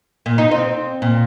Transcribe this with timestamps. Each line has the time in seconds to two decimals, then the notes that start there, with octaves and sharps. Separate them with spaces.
0.26 A#2
0.38 D#4
0.51 C4
1.02 A#2